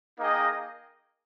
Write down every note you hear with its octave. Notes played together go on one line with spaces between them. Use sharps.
A#3 D#4 G#4 D#5 G5